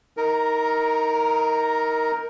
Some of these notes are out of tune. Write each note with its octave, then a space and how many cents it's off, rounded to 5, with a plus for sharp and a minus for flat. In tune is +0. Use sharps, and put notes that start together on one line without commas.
D#4 +25 A#4 +0